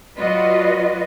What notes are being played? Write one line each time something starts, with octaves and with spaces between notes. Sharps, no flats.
F#3 F4 F#4 B4 D5 D#5